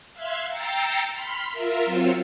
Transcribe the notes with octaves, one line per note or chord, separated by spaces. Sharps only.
E5 F5 C6 F#6 G#6
G5 A#5 E6 A6 C7 C#7
B5 C6 F6 B6
F4 A#4 E5
F#3 C4 F4 E6 C#7